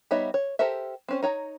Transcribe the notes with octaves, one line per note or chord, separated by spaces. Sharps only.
G3 B3 D#4 C#5 E5
C#5
G4 A4 A#4 C5 E5
C4 C#4 C5
D#4 C#5 A#5